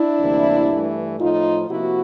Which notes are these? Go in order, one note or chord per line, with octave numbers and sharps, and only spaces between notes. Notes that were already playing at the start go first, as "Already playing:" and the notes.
Already playing: D4 E4
D2 C3 E3 G3 A#3
G2 E3 A3
A2 F3 A3 D#4 F4
C3 F3 A#3 E4 F#4